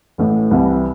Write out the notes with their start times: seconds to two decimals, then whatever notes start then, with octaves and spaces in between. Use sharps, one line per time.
0.18 A1 A2 E3 A3
0.51 C2 C3 E3 G3